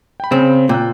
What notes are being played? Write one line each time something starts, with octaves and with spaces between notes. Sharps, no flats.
G5 B5
C#3 C4
A#2 G5 E6 F#6